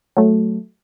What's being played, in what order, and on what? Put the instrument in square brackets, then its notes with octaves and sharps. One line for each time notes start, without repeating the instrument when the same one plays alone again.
[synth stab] F#3 A3